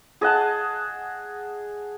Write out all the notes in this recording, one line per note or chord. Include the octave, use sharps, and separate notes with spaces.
G#4 D#5 F#5 A5